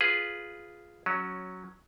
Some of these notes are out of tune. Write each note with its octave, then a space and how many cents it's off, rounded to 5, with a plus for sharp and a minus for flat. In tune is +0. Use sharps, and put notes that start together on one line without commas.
F4 +0 G#4 +0 B4 +0
F#3 +0 C#4 -5